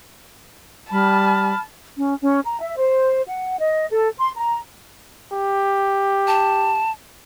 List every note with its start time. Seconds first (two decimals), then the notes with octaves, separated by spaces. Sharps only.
0.91 G3 A5 B5 F6
1.97 C#4
2.21 C#4
2.45 A#5
2.60 E5
2.77 C5
3.27 F#5
3.59 D#5
3.91 A4
4.17 C6
4.37 A#5
5.32 G4
6.27 A5